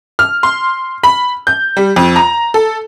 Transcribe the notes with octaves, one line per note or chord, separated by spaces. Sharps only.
F6
C6
B5
G6
G3
F2
A#5
A4